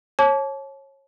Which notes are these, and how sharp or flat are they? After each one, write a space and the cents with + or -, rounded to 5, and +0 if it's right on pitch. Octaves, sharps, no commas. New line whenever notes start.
C#5 -25 A5 -30 D6 -35